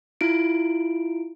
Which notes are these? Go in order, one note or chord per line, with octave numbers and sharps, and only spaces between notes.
E4 F4 D7